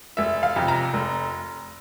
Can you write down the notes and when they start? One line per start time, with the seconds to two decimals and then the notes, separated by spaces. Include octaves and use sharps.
0.17 F1 E5
0.43 F5
0.56 F2 C3
0.68 A#5
0.93 F1